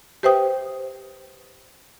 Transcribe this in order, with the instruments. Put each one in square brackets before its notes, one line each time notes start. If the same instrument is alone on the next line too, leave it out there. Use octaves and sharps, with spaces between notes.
[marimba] G4 B4 C5 E5 G5 D#6